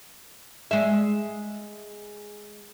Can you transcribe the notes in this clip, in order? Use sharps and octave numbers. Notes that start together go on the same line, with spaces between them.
G#3 E5